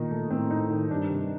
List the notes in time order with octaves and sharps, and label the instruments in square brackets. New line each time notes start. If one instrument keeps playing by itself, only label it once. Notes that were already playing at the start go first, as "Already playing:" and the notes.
Already playing: [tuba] A#2 [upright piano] D#3 D#4
[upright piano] A3
[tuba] A2 [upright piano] C4
[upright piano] D#4
D#3
[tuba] G2 [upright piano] D4
[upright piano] C3